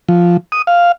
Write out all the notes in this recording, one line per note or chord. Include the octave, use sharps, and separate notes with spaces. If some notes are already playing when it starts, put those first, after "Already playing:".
F3
D#6
F5